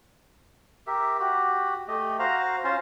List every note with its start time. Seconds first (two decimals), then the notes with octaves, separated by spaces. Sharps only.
0.87 G4 A#4 E5
1.19 F#4 G4
1.88 A3 G4 D#5
2.19 F#4 C5 F5 A#5
2.64 C#4 F4 C5